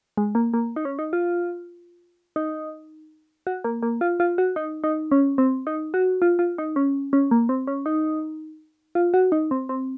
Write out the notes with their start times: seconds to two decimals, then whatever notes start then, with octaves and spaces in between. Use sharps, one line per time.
0.17 G#3
0.35 A#3
0.54 A#3
0.76 D#4
0.85 C#4
0.99 D#4
1.13 F4
2.36 D#4
3.47 F#4
3.64 A#3
3.83 A#3
4.01 F4
4.20 F4
4.38 F#4
4.56 D#4
4.84 D#4
5.12 C#4
5.38 C4
5.67 D#4
5.94 F#4
6.22 F4
6.39 F4
6.58 D#4
6.76 C#4
7.13 C#4
7.31 A#3
7.49 C4
7.67 C#4
7.86 D#4
8.95 F4
9.14 F#4
9.32 D#4
9.51 C4
9.69 C4